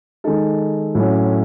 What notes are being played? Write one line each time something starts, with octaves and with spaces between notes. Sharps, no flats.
D#3 G#3 D#4 A4
A2 F#3 C#4